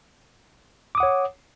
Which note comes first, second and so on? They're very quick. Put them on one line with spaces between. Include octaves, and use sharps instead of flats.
D6 D#6 F#5 C#5